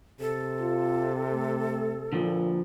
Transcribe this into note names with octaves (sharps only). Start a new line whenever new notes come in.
C3 A4
F4
A3
A#2 D3 F3